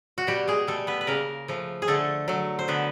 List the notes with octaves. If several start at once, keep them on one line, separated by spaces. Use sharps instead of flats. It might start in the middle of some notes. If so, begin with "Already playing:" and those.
F#4
B2 G3 G4
G#3 G#4
G3 A3 A4
B3 B4
B4
C#3 A#3 A#4
F3 A3
G#4
D3 A3 A4
F#3 A3
C5
D3 B3 B4